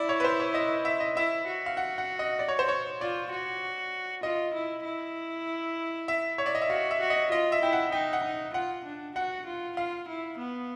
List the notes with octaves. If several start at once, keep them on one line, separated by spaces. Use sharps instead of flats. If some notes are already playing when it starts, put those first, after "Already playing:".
Already playing: E4 D5
C#5
B4
C5
C#5
D#5
E5
D#5
E4 E5
F#4
F5
F#5
F#5
D#5
D5
C#5
C5
C#5
F4 D5
F#4
F4 D#5
E4
E4
E5
C#5
D5
D#5
E5
F#4 F5
E5
F#4
D#5
F4 D#5
E5
E4 G5
F#5
D#4 G5
F#5
D#4
F4 F#5
D4
F#4 F#5
F4
F4 F5
E4
B3